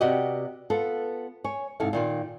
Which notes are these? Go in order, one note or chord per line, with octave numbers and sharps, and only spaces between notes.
C3 B3 F#4 G4 D5 D#5
B3 F4 A4
C#5 G#5
G#2 C3 E4 A4 F5
A#2 D#3 F4